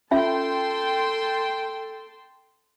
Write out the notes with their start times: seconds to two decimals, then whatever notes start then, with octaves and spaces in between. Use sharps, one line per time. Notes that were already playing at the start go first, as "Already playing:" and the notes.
0.11 C#4 F4 A4 E5 G5 A5 C6